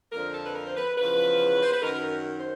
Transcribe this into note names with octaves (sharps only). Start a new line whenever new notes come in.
F2 D3 F3 A#4
A4
B4
A#4
C5
B4
E2 C#3 F3 B4
C5
B4
F#2 D#3 A#4
C5